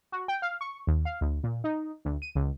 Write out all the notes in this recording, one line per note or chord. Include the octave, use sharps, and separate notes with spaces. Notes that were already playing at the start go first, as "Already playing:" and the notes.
F#4
G5
F5
C#6
D#2
F5
D2
A#2
D#4
D2
D#7
C#2